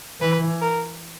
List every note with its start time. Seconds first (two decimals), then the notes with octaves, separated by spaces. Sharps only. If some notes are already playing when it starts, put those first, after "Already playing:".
0.21 E3 B4
0.61 A#4